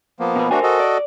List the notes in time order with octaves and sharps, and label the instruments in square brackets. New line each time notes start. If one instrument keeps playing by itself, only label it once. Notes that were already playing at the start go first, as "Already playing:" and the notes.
[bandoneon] F3 A#3 B3
[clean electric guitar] B2 B4
[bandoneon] A3 D4 F#4 [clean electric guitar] A#4 C5 G#5
[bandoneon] F#4 A4 D#5
[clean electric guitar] D5